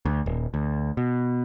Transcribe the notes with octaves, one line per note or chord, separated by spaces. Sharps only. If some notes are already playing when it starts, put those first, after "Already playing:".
D2
D#1
D2
B2